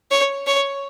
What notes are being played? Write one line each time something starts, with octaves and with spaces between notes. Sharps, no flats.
C#5
C#5